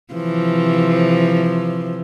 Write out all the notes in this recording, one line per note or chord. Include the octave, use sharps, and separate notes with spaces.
C3 E3 F3